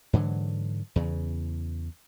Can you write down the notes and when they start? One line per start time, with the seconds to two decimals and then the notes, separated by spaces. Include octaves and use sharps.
0.13 G#2 D3 E3 F#3
0.96 E2 C#3